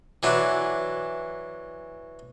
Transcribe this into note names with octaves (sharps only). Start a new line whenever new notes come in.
E3 F#3 D4